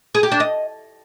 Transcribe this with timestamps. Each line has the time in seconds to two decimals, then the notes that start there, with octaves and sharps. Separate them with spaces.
0.15 G#4
0.23 G4
0.32 D4
0.40 D#5